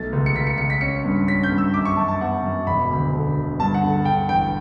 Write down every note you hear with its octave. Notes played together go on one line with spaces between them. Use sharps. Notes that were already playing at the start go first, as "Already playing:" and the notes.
Already playing: B1 A3 A6
C#2
C#7
C#2 B6
C#7
C#2 C#7
B6
C#4 C#7
G2
C#4 B6
G6
G2
E6
F#2 D6
C#6
F#2 A5
A5
B3 F#5
F#2
E1 B5
D2
D3
D2
G2 A5
F#5
D3
D3 G5
A1 G5